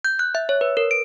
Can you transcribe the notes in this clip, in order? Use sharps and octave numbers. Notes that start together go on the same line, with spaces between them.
G6
F#6
E5
C#5
B4
A#4
D7